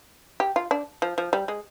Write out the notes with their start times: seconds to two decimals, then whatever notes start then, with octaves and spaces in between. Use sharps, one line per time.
0.40 G4
0.56 F4
0.71 D4
1.02 F3
1.18 F3
1.33 G3
1.48 G#3